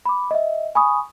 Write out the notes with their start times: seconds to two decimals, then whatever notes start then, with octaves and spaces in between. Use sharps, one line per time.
0.06 B5 D6
0.31 D#5 E5
0.75 G#5 B5 C#6 D#6